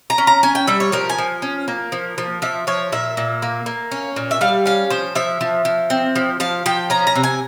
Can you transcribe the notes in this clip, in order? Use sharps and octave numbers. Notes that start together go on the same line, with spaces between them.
A#5
C#4
A#5
C#4 G#5
G5
G3 E5
C#5
F3 A#4
G#5
F3
C#4
A#3
F3
F3
F3 E5
F3 C#5
A#2 E5
A#2
A#3
A#3
C#4
A#2
E5
G3 F5
C#4 F5
F3 C5
F3 E5
F3
F3
C4
F3
F3 F5
F3 G5
C#4 A#5
A#5
C3
G#5